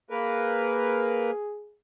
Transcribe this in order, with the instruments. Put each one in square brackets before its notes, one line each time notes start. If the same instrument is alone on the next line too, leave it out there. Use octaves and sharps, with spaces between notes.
[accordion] A#3 A#4 B4 [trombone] G#4